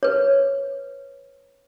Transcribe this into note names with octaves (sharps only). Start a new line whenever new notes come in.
B4 C#5